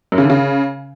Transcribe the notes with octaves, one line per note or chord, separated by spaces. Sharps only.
F#2
C#3
D3
C#3